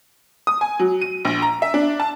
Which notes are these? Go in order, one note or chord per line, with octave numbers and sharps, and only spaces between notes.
D#6
G#5
F#3
D#7
A#1
A#5
E5
D4
A5